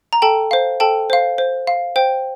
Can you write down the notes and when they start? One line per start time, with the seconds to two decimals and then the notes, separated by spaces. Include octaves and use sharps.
0.13 A#5
0.22 A4 G5 A5
0.51 C5 F5
0.80 A4 G5 A5
1.10 C5 F5
1.38 C5
1.67 F5
1.96 C5 G5